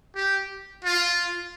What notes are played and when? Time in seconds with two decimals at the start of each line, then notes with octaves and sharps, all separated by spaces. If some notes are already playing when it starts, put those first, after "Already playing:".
0.16 G4
0.84 F4